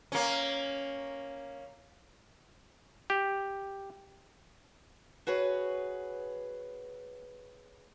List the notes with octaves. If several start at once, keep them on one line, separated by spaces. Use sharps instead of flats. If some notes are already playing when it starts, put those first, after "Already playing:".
A#3 C#4
G4
F#4 G#4 B4 C#5